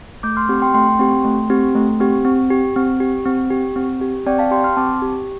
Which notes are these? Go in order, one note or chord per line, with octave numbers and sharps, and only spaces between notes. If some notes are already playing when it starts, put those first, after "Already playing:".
A3 D6 G6
C6 F6
C4 G4 C6 F6
G5 C6
A3 G5 C6
C4 G4
A3
C4 G4
A3
C4 G4
C4
G4
C4
G4
C4
G4
C4
G4
C4 D5 G5
F5 A5
G4 G5 C6
C6 F6
C4 A5 D6
G4